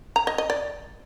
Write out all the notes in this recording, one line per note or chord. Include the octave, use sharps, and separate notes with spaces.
A#5
D#5
D#5
D5